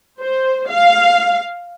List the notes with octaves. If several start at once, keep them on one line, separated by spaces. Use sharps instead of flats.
C5
F5